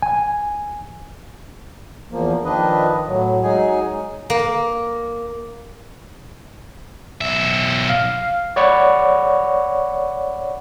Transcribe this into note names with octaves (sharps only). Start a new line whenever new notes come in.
G#5
E2 F3 A#3
D#3 F3 D4 B4 D#5
A2 F#3
F#3 G#3 D#4 G#4 G#5
A#3
B1 E5
F5
C#5 D5 F#5 B5 C#6